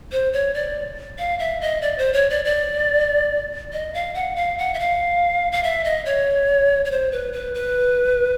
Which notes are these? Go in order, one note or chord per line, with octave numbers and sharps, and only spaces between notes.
C5
C#5
D5
F5
E5
D#5
D5
C5
C#5
D5
D5
D#5
F5
F#5
F5
F#5
E5
F5
F5
E5
D#5
C#5
C#5
C5
B4
B4
B4